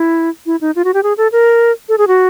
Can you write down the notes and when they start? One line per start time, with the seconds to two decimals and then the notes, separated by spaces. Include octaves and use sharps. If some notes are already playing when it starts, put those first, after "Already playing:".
Already playing: E4
0.46 E4
0.61 D#4
0.76 F4
0.85 F#4
0.94 G4
1.03 G#4
1.18 A4
1.32 A#4
1.89 A4
1.98 G#4
2.08 F#4